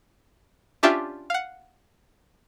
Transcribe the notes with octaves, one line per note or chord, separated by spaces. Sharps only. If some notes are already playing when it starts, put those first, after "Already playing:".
C#4 D4 F4 G4 E5 A5
F5 F#5